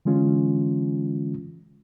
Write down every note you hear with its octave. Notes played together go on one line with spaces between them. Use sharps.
D3 E3 G#3 C#4 F4